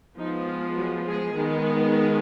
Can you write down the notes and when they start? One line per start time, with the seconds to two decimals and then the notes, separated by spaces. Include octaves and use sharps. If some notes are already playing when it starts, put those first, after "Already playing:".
0.18 F3 G#3 B3 D#4
0.47 F4
0.76 F#3 F#4
1.06 G#3 G#4
1.35 D#3 G#3 B3